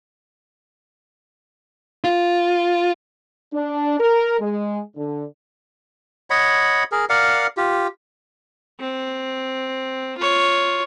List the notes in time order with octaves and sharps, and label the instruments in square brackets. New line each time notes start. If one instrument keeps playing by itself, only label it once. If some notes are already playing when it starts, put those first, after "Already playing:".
[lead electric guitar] F4
[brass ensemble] D4
A#4
G#3
D3
[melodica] C#5 D#5 F#5 B5
G#4 A#4
A#4 D5 F5 F#5
F4 G4
[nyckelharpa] C4
F4 C#5